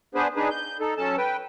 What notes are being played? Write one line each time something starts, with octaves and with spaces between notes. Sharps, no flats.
B3 D4 G#4 B4 C5
D4 D#4 G#4 B4
G6
D#4 A4
F#3 C#4 A4 A5
B4 G5